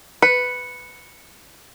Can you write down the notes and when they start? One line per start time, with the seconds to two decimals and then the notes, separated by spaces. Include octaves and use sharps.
0.22 B4 C#7